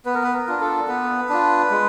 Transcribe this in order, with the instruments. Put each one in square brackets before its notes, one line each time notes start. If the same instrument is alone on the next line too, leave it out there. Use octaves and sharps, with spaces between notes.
[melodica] B3 B4
A#4
B4
A#4
D4 F4
A4
B3 B4
D4 F4
G#3